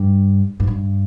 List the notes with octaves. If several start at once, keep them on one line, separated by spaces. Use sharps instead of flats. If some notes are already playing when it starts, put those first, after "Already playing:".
Already playing: G2
G#2
G2